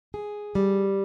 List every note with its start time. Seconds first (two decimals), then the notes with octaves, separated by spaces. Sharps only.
0.14 G#4
0.55 G3